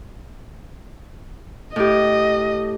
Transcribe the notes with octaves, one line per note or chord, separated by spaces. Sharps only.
A2 G4 D#5